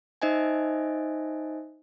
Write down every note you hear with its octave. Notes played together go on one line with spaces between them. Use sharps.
D#4 C5 D#5 E5 G#5